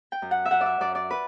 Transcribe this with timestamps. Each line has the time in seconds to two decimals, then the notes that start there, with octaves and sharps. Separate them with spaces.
0.12 G5
0.22 F#2
0.31 F#5
0.45 E5
0.51 F#2 F#5
0.61 D5 E5
0.80 F#2 D5
0.95 D5
1.11 B4